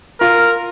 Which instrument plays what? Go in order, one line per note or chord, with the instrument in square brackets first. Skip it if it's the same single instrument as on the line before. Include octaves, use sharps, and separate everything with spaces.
[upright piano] F4 [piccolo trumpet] A#4